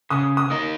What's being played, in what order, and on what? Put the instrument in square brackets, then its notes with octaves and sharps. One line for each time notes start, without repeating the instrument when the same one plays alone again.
[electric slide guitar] C#3 [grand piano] D#6
[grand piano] D#6
[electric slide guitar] A#3 D#4